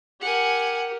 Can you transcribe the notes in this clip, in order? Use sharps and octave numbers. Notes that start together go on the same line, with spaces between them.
G4 A#4 F#5 G#5